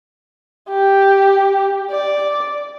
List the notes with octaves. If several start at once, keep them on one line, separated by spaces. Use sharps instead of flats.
G4
D5